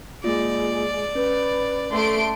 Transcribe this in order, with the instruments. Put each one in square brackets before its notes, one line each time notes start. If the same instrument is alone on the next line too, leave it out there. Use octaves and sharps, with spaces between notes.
[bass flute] G#3 [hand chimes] A#3 F4 [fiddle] D5
[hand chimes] C#4 [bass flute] B4
[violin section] A3 C6 D7